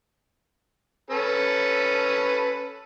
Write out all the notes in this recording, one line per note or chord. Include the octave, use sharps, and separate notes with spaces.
C#4 A4 B4